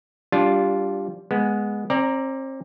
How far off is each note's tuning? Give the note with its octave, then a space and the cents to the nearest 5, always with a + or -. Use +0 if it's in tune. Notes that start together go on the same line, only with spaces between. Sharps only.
G3 +0 D4 -20 F4 +0
G#3 +0 B3 -10
C4 +35 D5 +0 A#5 -5